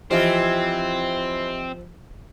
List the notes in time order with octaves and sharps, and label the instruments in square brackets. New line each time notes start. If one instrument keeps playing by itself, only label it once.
[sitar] E3 F4 [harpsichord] F3 [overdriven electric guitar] C4 [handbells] G4 D#5 E5